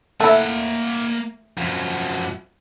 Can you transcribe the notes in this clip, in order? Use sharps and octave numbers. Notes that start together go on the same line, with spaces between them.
A3 A#3 E4 F#5
F#2 F3